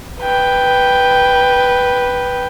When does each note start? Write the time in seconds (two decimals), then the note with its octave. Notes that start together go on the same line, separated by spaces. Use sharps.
0.20 B4 G5